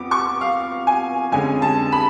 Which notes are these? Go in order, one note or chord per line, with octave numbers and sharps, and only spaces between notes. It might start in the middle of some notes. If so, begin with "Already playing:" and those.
Already playing: F2 F3 B3 D6
C#6
F5
G#5
F2 D3 G#3 C#4 G#5
A5
B5